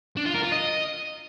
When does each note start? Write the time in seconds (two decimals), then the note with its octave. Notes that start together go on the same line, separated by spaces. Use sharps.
0.17 D4
0.26 F4
0.34 A#4
0.43 F4
0.52 D#5